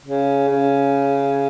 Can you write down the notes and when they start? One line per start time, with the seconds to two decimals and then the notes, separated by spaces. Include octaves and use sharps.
0.03 C#3
0.48 C#3